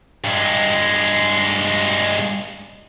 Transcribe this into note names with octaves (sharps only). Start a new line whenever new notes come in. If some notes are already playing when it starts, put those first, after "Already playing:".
G2 G#3